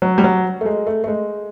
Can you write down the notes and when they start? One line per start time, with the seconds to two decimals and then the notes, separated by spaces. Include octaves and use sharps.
0.02 F#3
0.18 G3
0.24 F#3
0.61 A3
0.66 G#3
0.87 A3
1.04 A3
1.08 G#3